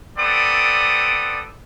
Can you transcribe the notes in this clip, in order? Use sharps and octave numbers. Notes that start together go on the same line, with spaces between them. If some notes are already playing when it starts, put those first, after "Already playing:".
B3 C4 A4 D5 D#6